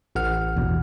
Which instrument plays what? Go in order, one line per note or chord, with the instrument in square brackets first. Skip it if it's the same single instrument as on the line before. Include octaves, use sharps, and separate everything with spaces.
[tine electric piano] A1 F#5 F6
[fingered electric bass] E2 B2